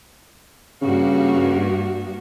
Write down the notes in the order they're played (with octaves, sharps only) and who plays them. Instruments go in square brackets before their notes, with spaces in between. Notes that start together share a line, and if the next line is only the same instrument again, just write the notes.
[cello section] G2 A#3 F#4 [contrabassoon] C#3